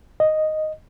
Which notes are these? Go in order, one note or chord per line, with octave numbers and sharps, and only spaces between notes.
D#5